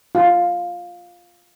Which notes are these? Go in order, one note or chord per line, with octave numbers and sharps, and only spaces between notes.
F4